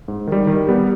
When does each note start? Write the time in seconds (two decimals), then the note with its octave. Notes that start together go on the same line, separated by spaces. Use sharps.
0.08 G#2
0.27 D#3 G3
0.47 D#3
0.67 G3 B3 G4